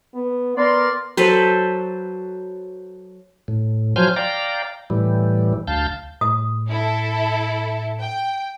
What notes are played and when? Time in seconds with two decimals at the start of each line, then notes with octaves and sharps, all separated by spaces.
0.15 B3
0.57 B3 A#4 D5 C6
1.17 F#3 A4 B4 C5
3.48 A2
3.96 F3 F#3 C5 G#5 F6 G6
4.16 D5 F5 G5 A#5
4.90 A2 E3 G3
5.67 D2 F5 A5 G6
6.21 A2 D#6
6.69 E4 A4
8.00 G5